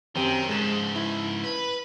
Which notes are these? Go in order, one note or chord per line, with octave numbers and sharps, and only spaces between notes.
F#2 D#3 C4 G4
G#2 C#3 G#3 E7
E4
B4